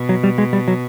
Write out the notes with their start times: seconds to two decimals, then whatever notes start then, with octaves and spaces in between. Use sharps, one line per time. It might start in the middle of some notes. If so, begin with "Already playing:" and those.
Already playing: B2
0.09 F#3
0.24 G3
0.38 G#3
0.53 G3
0.68 F#3